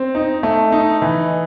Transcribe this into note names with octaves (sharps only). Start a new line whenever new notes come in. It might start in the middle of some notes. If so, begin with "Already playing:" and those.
Already playing: C4
D#4
A3
D#4
E3